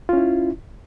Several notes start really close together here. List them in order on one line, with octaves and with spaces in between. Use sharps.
F4 C#4 E4